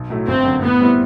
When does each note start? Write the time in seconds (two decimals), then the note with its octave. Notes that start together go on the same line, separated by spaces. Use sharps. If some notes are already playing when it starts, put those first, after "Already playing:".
Already playing: B1
0.10 A2 F#3 A3
0.27 G1 C4
0.44 F#2 D3
0.62 A2 B3
0.81 G3 C4 E4